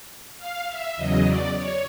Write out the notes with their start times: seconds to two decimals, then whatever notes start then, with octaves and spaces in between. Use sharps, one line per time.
0.38 F5
0.67 E5
0.96 E2 C#3 F#3 D#5
1.25 D5
1.54 C#5